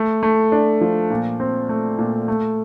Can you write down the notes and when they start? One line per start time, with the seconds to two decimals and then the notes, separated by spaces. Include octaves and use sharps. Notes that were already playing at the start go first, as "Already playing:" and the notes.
Already playing: A3
0.23 A3
0.52 D4
0.81 F3
1.10 A#2
1.40 C4
1.69 A3
1.98 A#2
2.28 A3